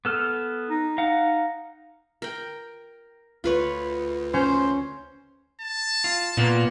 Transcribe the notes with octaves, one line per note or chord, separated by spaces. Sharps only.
B3 A4 F6
D#4
D#4 F5 F#5
A#4 G5
D2 F4 B4 C#5
C#4 C5
A5
F4
A#2 A#3 B3 F4